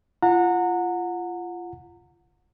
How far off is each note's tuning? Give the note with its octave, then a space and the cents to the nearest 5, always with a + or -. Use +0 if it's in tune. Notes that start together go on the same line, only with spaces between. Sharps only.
F4 -25 F#5 -20 A#5 -30